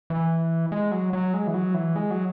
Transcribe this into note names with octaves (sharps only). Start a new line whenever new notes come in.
E3
G#3
F#3
F#3
G#3
E3
F#3
E3
G#3
F#3